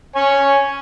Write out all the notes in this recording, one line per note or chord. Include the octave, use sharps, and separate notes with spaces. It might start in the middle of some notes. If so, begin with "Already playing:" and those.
C#5 G#5